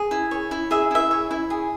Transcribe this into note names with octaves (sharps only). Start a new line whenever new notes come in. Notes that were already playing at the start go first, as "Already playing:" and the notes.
Already playing: G#4
E4
C#5
E4
G#4 E5
E4 E5
C#5
E4
G#4